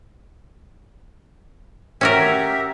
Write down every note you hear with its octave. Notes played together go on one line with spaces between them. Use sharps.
C#4 F#4 G4 A#4 E5